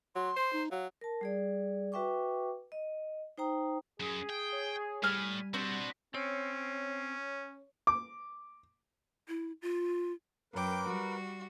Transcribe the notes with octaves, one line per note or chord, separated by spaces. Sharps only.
F#3 C6
C5
D#4
F#3 F5
A#4 A5
G3 G#4 D5
F#4 B4 E5 G5 C#6 D6
D#5
D#4 C5 G5 A#5 D#6
F#2 G#4
G5
C#5
A2 G3 G#5 F6
B3 C4 D4 F#4
C4 C#4 C#5
D6
E4
F4
F#2 A#4 B4 G5 D6
G3 F#4